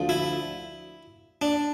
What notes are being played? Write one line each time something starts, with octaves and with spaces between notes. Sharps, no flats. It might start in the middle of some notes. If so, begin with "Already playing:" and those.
Already playing: D2 D3 F3
E4
D4